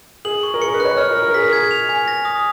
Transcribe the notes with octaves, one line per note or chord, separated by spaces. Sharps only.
G#4 F#7
C#6
A#4
G#4 C#7
A#4
B4
F#6
C#5
C#5 F6
A#4
F6
A#4
G#4 B6
A#4
G#4 G#6
F7
G#5
A#6
D#6